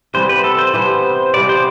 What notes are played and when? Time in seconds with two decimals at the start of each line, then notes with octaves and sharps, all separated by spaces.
0.14 C3 E3 G3 B3 C5
0.29 B4
0.44 A4
0.59 C5
0.74 C3 E3 G3 B3 C5
1.34 C3 E3 G3 B3 D5
1.49 C5